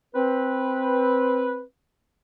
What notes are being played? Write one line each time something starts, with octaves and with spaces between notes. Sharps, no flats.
C4 B4